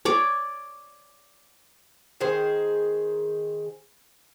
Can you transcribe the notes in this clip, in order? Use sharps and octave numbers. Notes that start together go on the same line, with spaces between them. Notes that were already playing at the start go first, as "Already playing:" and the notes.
C#5 D5 D6
D#3 G#4 C5